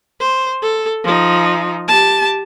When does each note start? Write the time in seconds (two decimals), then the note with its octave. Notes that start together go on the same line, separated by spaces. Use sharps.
0.20 C5
0.62 A4
1.04 F3 D#4
1.88 G4 A5